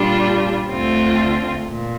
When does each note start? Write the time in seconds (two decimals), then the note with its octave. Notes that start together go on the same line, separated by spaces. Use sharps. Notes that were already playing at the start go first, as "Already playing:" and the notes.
Already playing: A#2 G3 D4 F4
0.70 D2 D3 A3 C4 F4
1.68 A#2